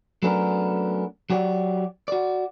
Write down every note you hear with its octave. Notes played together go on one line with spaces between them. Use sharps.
F#3 A3 B3 C#4 D4 A#4
F#3 F#4 G4 C#5 D5
F#4 D5